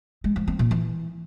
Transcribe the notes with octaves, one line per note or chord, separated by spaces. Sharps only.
G#3
F3
C4
A#2
E3